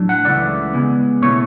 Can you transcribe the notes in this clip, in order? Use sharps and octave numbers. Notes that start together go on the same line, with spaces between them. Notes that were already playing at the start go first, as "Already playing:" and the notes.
Already playing: A2 F#3 D4
F#5
C#2 C#3 E3 A3 E4 D5
C#3 G#3 B3
B2 A3 E4 C#5